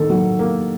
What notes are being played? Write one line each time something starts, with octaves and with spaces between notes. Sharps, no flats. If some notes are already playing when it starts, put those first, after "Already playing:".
Already playing: D#3 A#3 A4 A#4
F#3
A#3